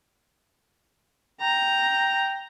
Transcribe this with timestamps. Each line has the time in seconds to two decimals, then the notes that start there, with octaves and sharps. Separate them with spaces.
1.41 G5 A#5